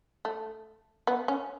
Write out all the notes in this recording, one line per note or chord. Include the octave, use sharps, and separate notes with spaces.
A3
B3
C#4